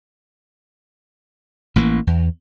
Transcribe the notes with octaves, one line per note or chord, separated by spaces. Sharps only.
A1 E3 A#3
E2